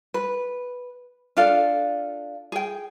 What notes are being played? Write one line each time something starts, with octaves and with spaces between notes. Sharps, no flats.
B4
D4 F4 A4 F5
G#4 G5